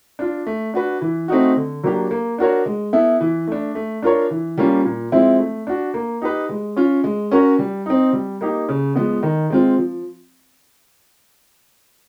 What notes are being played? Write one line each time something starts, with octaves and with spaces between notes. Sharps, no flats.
D4 F4
A3
D4 F#4 B4
E3
A3 C4 D#4 F#4
D3
F#3 A#3 D4 G4
A#3
D4 F#4 A#4 C#5
G#3
B3 E4 A4
E3
A3 D4
A3
D4 F4 A#4 C#5
E3
G3 A#3 C#4 F4
A#2
F3 G#3 C4 E4
A3
D4 F#4
A#3
D#4 G4 B4
G#3
C#4 F4
G#3
C#4 F#4 A#4 C#5
G3
C4 D#4
G3
A#3 D#4 G4
C#3
F3 G#3 B3
D#3
G#3 C4 F4
F3